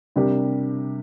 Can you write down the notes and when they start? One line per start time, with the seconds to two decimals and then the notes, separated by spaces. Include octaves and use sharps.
0.16 C3 G3 D4 G4 A#4